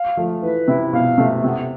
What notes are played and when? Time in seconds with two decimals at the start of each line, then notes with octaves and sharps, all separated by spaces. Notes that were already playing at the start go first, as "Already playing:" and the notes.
Already playing: F5
0.17 F3 A3
0.43 E3 B4
0.68 C3 E4
0.93 B2 F5
1.18 C3 A3
1.44 C3 B3